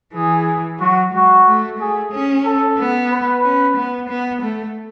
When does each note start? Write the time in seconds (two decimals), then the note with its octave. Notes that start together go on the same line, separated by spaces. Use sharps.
0.13 E3 G#4
0.79 F#3 F#4
1.12 G#3 F#4
1.46 A3
1.79 A3 G#4
2.11 C#4
2.44 A4
2.78 B3
3.10 B4
3.43 C#4
3.76 B3
4.09 B3
4.41 A3